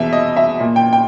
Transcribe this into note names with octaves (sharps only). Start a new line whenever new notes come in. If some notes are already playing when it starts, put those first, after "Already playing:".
Already playing: E2 B2 E5
D#5
E5
A#2
G5
G5